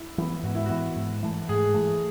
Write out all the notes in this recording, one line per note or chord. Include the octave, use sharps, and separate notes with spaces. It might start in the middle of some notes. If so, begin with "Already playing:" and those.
Already playing: E4
E3 B3
G#2 F#4
E4
E3 B3 F#4
G#2
E3 A3
G#2 G#4
E3 A3